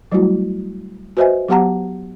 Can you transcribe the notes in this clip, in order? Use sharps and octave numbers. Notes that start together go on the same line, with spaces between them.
F#3 G3 A3 E4 F#4
F#4 B4 C5 D#5 E5 G#5
F#3 B3 G4 F#5 A5 A#5